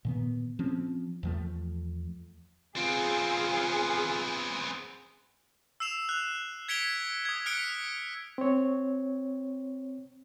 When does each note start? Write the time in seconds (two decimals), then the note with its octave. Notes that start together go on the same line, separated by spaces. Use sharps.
0.05 A#2 D#3 B3
0.59 F3 C4 C#4
1.23 E2 F3 A3
2.76 B3 C4 F4 G#4
5.80 E6 C7 E7 F7
6.09 F#6 F7
6.68 G#6 B6 C#7 D7 F7 G7
7.25 D#6 G#6
7.46 F6 F#6 B6 C#7 D7 G7
8.38 C4 C#5